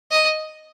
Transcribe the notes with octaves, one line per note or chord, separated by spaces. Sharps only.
D#5